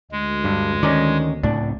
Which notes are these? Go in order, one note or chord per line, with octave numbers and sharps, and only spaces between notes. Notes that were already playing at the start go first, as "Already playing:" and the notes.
D2 G#3
G2
D#3 C#4 D#4 D5
C#2 A2 A3 D4